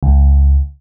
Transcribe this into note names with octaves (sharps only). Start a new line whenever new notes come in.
C#2